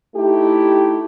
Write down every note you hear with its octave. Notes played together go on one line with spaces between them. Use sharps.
A3 D#4 E4 G4